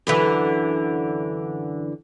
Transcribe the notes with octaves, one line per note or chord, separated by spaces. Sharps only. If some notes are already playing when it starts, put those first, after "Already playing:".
F#2 D3 E3